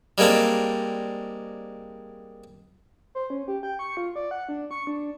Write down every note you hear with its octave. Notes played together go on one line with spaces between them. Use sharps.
G3 G#3 A#3 C4 D4
C5
C#4
G4
G5
C#6
F4
D5
F#5
D4
C#6
D4